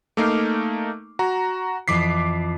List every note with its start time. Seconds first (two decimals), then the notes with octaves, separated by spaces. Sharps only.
0.17 A3 A#3 D#4 D6 F6 C7
1.19 F#4 A#5
1.88 F2 E3 D6 B6 C7